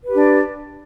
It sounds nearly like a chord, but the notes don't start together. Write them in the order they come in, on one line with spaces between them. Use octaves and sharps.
B4 G4 D4